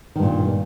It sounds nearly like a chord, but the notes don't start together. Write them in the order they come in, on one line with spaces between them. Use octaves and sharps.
D#3 G2 A#2